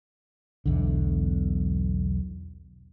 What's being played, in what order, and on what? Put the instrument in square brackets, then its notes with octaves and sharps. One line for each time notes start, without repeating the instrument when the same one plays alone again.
[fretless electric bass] B1 E2 D3